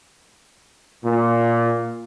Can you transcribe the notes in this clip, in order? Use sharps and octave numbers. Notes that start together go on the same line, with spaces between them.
A#2